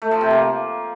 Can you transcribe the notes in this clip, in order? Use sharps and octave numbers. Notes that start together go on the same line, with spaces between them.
A3
F3
C3
A#3